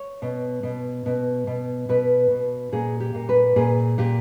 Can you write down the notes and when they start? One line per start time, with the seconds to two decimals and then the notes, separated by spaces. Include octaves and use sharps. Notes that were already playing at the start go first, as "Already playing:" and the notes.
Already playing: C#5
0.22 B2
0.63 B2
1.06 B2
1.47 B2
1.89 B2 B4
2.31 B2
2.72 A#2 G#4
3.00 G4
3.15 A#2
3.29 B4
3.56 A#2 G#4
3.98 A#2 G4